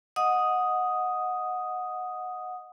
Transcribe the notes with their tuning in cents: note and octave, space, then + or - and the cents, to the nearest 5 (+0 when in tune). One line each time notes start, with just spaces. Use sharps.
D#5 +0 F#5 -15 D#6 +0